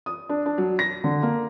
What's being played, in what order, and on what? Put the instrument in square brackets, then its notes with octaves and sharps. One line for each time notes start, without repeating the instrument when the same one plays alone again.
[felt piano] D#6
D4
D4
F#3
A#6
D3
A#3